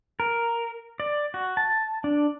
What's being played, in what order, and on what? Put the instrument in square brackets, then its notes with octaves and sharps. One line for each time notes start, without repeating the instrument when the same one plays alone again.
[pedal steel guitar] A#4
D5
F#4
A5
D4